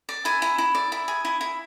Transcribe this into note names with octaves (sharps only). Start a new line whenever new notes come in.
D5
E4 G#5
E4
E4
D5
E4
G#4
E4
E4